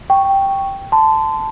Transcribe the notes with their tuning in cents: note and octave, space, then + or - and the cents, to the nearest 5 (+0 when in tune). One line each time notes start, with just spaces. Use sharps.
G5 +0 C#6 +0
A5 +0 C6 -25